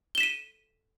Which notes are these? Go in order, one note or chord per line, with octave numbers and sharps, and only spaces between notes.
B6 D#7 E7 G7